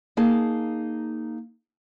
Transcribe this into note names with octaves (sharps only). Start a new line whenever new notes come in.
A#3 D#4 G#4 A5